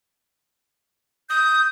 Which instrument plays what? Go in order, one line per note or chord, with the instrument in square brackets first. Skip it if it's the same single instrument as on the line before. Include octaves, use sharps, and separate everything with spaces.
[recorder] D#6 [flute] G6